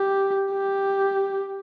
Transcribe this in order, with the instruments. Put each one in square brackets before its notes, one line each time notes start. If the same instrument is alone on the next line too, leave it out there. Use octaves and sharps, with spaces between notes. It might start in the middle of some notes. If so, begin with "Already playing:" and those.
Already playing: [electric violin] G4
G4